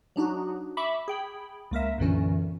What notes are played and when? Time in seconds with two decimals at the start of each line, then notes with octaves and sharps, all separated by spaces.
0.16 F#3 D4 D#4 F#4
0.77 E5 B5 C#6 D6
1.08 G#4 G5 B5
1.71 C#2 A#3 A#4 E5
1.98 B1 F#2 A#2 D3 E3 C#4